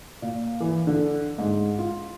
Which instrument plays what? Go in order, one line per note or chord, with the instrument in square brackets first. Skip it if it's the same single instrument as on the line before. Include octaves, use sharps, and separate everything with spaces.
[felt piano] A#2
E3
D3
G#2
F4